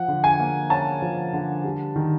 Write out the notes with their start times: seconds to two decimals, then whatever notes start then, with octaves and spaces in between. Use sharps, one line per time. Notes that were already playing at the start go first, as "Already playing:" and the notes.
Already playing: F3 F#5
0.08 D3
0.24 G#5
0.40 A#3
0.70 C#4 A5
1.02 F3
1.33 D3
1.64 G3
1.96 D#3